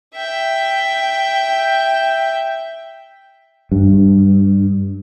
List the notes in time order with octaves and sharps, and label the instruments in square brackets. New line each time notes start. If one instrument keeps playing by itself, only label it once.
[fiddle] E5 G5
[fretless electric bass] G2